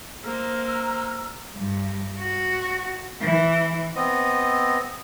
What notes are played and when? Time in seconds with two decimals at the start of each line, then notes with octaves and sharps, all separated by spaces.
0.24 A#3 C5 A#5 E6 F6
1.55 G2
2.18 F#4
3.21 E3
3.95 B3 C4 D#5